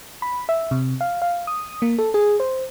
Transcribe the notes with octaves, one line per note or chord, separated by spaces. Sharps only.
B5
E5
C3
F5
F5
D#6
A#3
A4
G#4
C5